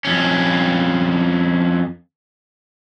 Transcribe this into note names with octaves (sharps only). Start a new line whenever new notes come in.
F2 C#4